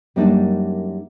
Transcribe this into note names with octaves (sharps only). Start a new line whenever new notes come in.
F#2 G3 A#3 D4 D#4